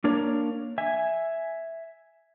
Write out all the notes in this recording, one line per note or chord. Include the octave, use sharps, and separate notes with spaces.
A#3 D4 A#4 C#5
E5 G#5